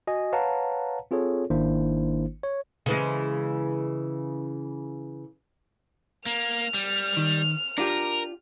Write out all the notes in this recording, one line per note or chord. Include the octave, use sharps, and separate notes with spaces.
F#4 D#5 G#5
B4 C#5 F5 F#5 A5 A#5
C4 F4 G#4 A4 C#5
G#1 D#3 A#3 D4 E4 C5
C#5
C#3 E3 G#3
A#3 F6
G3
D#3
D4 F4 G4 A#4